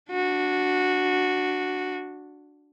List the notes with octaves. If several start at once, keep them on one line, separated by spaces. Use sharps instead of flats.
D4 F#4